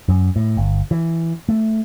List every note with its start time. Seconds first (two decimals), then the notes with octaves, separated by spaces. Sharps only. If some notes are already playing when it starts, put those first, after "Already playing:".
0.08 F#2
0.36 A2
0.57 G1
0.91 E3
1.49 A3